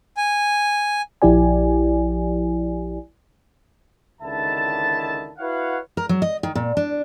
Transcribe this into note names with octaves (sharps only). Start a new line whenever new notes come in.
G#5
A#1 F3 E4 G4 D5 G#5
C#2 D3 D#3 E4 E5 A5
E4 F#4 B4 C#5 F5 F#5
A#4
F#3
D#5
D#3
A#2
D4